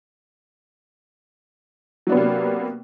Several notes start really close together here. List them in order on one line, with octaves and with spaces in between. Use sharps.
F#3 D4 B3 C3 A#3